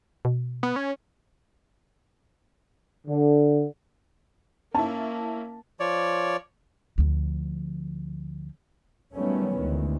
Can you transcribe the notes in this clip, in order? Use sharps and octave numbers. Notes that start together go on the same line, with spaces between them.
B2
B3
C#4
D3
A#3 C#4 E4 A5
F3 C#5 D5
D2 F3
D#3 F#3 G3 A3 B3 C#4
D2 D#3 E3 G#3